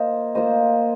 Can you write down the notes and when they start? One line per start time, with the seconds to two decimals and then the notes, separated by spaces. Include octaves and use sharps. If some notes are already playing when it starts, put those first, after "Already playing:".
Already playing: A#3 F4 C5 D#5
0.35 A#3 F4 C5 D#5